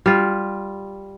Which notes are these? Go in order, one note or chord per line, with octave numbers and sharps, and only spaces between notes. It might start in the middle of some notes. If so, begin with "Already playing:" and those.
G3 F4